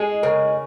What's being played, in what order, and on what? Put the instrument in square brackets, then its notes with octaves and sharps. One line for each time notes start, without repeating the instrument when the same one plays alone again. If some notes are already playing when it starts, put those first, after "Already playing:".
Already playing: [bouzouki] G#3 [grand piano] G#4
[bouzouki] C#3 [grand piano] A#4